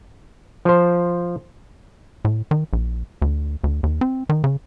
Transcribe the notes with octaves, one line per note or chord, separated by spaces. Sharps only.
F3 C5
A2
D#3
A#1
D2
D2
D#2
C4
D#3
C#3